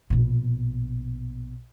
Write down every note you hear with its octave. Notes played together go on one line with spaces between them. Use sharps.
A#1 B2